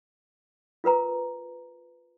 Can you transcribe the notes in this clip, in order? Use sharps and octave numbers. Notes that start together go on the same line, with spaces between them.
F4 A#4 B4 A#5